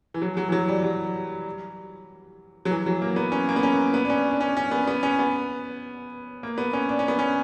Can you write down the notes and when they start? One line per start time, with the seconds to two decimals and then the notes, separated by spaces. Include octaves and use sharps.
0.14 E3
0.22 F#3
0.37 F#3
0.49 E3
0.52 F#3
0.68 G3
0.83 F#3
2.65 F#3
2.71 E3
2.86 F#3
3.02 A#3
3.16 B3
3.32 C#4
3.49 A#3
3.56 B3
3.63 C#4
3.94 B3
4.05 D4
4.10 C#4
4.31 D4
4.41 C#4
4.57 C#4
4.71 B3
4.87 B3
5.03 C#4
5.19 B3
6.43 A#3
6.58 B3
6.73 C#4
6.89 D4
6.99 C#4
7.08 B3
7.19 C#4